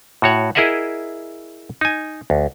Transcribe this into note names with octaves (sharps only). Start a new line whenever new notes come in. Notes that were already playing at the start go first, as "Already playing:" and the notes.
A2 F#4 C#5 F#5
E4 G#4 A#4 D#5 E5 F#5
D#4 G#5
D2